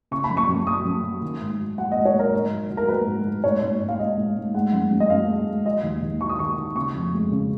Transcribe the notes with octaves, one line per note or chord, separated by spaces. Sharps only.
C#3 C#6
B5
F#2
C#6
F#2
F#3 D#6
F#2
F#3
D#3
G#2
F#3
F#3 F#5
G#2 D#5
C#5
F#3 A#4
G#2
F#3
F#3
A#4
F#3 B4
G#2
F#3
G#2 C#5
G#2
G#2
F5
G#2 D#5
G#2
G#2
G#3 F#5
F#2
F#2
D#5
F#2 F5
G#3
G#3
F#3 D#5
D#2
D#2
F#3 C#6
D#6
D#3 C#6
D#3
C#3 C#6
F2
G#3
C#3